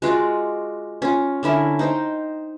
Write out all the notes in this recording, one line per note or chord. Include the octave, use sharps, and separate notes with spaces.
G#3 F4 F#4 D5
C#4 F4
D3 C#4 E4 A#4
D#4 C5 G5